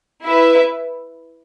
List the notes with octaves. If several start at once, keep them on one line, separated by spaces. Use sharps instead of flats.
E4 B4 E5